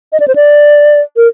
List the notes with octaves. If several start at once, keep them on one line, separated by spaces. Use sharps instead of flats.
D#5
D5
C5
D5
A#4